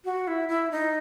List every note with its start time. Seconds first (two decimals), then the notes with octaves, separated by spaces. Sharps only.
0.05 F#4
0.27 E4
0.49 E4
0.71 D#4